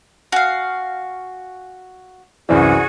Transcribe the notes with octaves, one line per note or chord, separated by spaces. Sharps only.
F#4 F5 G#5
C2 F#2 E3 E4 F#4 G#4 C5 D5